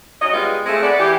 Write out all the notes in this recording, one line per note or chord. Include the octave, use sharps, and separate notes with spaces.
F#3 C#4 D#5
G3 G#3 B3 F4
G#3 A3 C4 G#4
B3 B4 D5
E3 G4